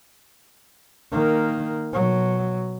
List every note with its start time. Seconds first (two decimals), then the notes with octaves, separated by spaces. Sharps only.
1.12 D#3 A#3
1.93 B2 F#3